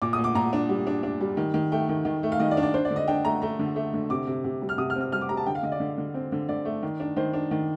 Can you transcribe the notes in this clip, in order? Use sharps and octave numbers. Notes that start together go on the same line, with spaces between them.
A#2 D6
D#6
A#2
D6
A#2 A#5
D4
G3
D4
D4
G3
D#3
D#3
A3 G5
D#3
D#3
A3
F5
D#3 D#5
D5
D4
D5
D4 C5
D5
D3
D#5
D4 G5
A3 A#5
A3 A#5
D3
A3
D3
C3 D6
C3
C3
G3
F6
C3 D#6
F6
C4
F6
G3 F6
D6
G3 A#5
A5
D3 G5
F5
D3 D#5
D5
D3
D3
C4
D3
D3 D5
A3
D#3
D4
D#3 C5
D4
D#3